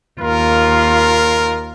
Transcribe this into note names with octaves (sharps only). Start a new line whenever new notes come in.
D#2 F4 A#4